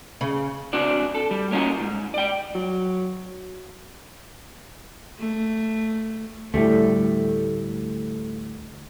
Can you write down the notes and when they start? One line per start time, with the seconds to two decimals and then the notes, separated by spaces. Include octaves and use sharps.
0.21 C#3
0.73 C4 D4 F#4 D5
1.15 A4
1.31 G3
1.51 A#3 C#4 D#4 F4 F#4
1.81 G#2
2.14 D5 G5
2.55 F#3
5.19 A3
6.54 D2 A2 G3 A3